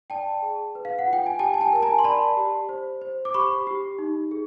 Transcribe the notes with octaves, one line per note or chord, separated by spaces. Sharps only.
D5 G5 A5
G#4
B4
F5
F#5
F4
G5
G#5
G4 G5 A5
G#5
G5 A5
A#4 A5
G#5 A#5
C6
D5 A5 B5
G4
C5
C5
D6
G4 B5 C#6
G4
D#4
G#4